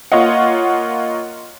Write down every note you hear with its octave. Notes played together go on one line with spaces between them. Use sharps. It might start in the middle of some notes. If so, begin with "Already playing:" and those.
A#3 F4 C#5 D#5 F#5